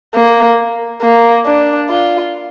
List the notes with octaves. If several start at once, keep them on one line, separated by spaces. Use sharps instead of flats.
A#3
A#3
D4
F4